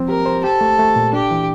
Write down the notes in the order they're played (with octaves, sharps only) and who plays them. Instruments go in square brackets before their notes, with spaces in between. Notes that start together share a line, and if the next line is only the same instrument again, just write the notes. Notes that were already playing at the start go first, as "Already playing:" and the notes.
Already playing: [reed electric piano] F3 C4
[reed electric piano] G4 [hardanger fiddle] A#4
[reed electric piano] C5
[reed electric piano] G4 [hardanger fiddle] A4
[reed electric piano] A3
A3
A#2
[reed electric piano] D4 [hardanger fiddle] G4
[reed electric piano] E3